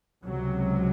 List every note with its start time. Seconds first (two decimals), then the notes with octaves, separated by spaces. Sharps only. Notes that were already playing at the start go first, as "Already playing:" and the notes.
0.23 C#2 C3 F#3